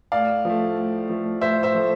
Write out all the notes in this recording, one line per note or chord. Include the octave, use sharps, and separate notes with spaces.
A2 D5 F5
F3 A3
A2
F3 A3
A2 C5 E5
C5 E5
F3 A3